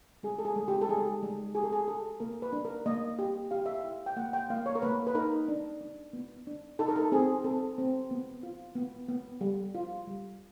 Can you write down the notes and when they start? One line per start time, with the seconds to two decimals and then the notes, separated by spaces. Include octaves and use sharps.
0.23 G#3 G#4
0.39 A4
0.45 G#4
0.56 G#3
0.68 G4
0.81 A4
0.89 G#3 G#4
1.23 G#3
1.55 G4 G#4
1.63 A4
1.73 G#4
1.88 D4 A4
2.20 A#3 A#4
2.42 B4
2.53 D4
2.65 A#4
2.86 A#3 D#5
3.19 G4
3.51 G4 F5
3.66 E5
3.80 E4 F5
4.06 G5
4.16 A#3 F#5
4.33 G5
4.50 A#3 F5
4.66 C#5
4.75 A#4
4.82 A#3 B4
5.07 B4
5.15 D#4 A#4
5.48 D4
5.81 D4
6.13 B3
6.47 D4
6.79 D#4 A4
6.88 A#4
6.96 A4
7.12 C4 G#4
7.44 C4 A4
7.78 C4
8.11 B3
8.43 F4
8.75 B3
9.09 B3
9.41 G3
9.75 F4
10.07 G3